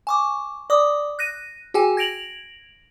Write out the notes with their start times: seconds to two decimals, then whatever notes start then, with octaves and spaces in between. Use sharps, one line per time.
0.07 G#5 C#6 D6
0.70 D5 D6 D#6
1.19 F#6 A#6 D#7
1.74 F#4 G#4 G5 G#5
1.97 G#6 A#6 D7 F7 F#7